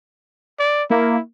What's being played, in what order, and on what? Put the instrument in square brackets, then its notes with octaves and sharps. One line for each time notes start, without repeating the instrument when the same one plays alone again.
[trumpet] D5
[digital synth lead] A#3 [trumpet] E4